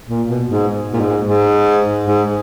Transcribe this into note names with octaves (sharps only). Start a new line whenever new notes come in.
A#2
B2
G#2
A#2
G#2
G#2
G#2